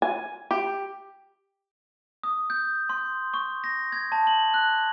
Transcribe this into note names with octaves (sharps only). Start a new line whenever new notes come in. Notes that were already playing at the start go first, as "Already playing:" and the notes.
G#5
G4
D#6
G6
C6
C#6
A#6
G#6
A5
F#7
F#6